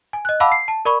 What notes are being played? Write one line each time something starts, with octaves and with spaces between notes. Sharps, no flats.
G#5
D#5 F#6
F5 F#5 A5 B5 D6 E6
C7
A5
A#4 D5 B5 C#6